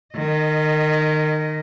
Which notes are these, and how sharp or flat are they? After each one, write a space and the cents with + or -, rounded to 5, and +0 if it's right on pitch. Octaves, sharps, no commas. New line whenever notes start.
D#3 -25 D#5 +0